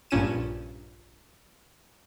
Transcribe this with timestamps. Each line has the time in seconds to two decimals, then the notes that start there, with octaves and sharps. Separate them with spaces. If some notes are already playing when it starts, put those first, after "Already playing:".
0.11 A#1 G2 A#2 C#4 D#7 E7